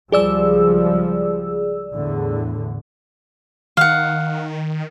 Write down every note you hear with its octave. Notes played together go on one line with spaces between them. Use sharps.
C#2 F3 G3 G#4 D5 E6
E2 A2 D3
D#3 F5 F#5